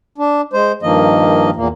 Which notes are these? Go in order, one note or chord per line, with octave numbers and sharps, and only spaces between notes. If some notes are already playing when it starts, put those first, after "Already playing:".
D4
G#3 C5
G2 D#3 F3 A#3 D#5
E2 A#2 A#3